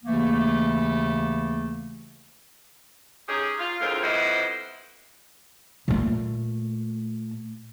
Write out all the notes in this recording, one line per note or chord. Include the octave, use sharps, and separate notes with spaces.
D#2 C#3 E3 A3 A#3
C#4 D#4 G4 G#4
F4
D2 A2 C4 F4 G#4 A#4
F2 G3 B3 E4 C5 D#5
A#2 A3